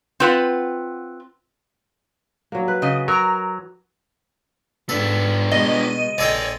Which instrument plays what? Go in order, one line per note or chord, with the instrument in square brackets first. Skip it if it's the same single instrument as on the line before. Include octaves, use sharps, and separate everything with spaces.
[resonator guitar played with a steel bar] C4 F4 B4 F#5
[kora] F#3 A#3
B4
[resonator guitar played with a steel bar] C#3 D#5
[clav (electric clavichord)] F#3 [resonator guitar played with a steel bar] A#4 A#5
[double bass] G#2 [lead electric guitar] B3 D4 [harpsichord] A4
[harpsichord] B2 [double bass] G#3 [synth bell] D#5
[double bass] A#1 [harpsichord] G#3 A4 G5 [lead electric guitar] C#5 D5